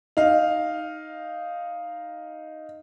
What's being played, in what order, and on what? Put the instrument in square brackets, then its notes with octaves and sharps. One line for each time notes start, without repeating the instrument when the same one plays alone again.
[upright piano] D#4 F5